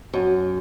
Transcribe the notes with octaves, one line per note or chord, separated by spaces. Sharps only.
F#2